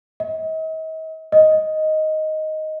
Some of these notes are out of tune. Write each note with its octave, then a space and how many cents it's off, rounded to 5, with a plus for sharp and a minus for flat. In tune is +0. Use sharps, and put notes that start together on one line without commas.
D#5 +40
D#5 +5